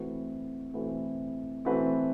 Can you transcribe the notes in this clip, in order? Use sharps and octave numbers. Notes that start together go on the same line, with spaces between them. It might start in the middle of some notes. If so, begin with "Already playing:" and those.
Already playing: E3 A3 C4 F#4 B4
E3 A3 C4 F#4 B4
E3 A3 C4 F#4 B4